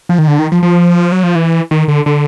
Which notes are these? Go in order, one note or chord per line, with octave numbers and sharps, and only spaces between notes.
F3
D#3
D3
D#3
F3
F3
F#3
F3
E3
D#3
D3
D3